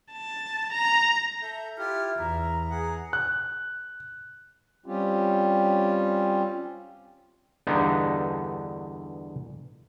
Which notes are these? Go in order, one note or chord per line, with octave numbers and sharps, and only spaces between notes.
A5
A#5
A4 E5 G6
E4 F4 G4 F6
E2 E5 A#5
G#4 F#5
F#6
G3 C4 C#4 F4 G4
E2 G2 D3 B3 D#4